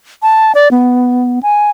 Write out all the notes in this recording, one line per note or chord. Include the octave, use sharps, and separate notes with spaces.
A5
D5
B3
G#5